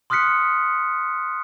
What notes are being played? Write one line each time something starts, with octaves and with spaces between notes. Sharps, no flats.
C6 D#6 F6 F#6 B6 C#7